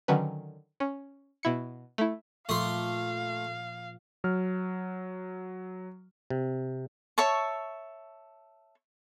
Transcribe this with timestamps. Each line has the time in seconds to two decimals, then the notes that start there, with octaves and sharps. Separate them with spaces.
0.08 D3 D#3 F#3 C#4 B4
0.80 C#4
1.43 B2 E4 C#7
1.98 A3 E4
2.49 A#2 F3 A3 F5 C6 D6
4.24 F#3 F6
6.30 C3
7.18 C#5 E5 A5 C#6